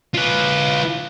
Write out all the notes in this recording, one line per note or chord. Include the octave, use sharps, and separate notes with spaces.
F4 B4